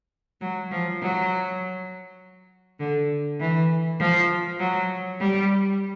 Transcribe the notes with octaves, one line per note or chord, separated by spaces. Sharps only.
F#3
F3
F#3
D3
E3
F3
F#3
G3